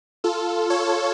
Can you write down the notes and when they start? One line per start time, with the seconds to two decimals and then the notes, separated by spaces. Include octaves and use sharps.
0.24 F4 A4
0.70 A4 C#5